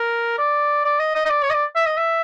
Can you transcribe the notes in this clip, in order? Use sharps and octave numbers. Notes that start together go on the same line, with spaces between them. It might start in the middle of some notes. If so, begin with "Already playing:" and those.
Already playing: A#4
D5
D5
D#5
D#5
D#5
D5
C#5
D#5
D5
E5
D#5
E5